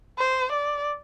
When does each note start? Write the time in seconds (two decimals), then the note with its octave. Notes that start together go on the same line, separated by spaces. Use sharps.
0.18 C5
0.52 D5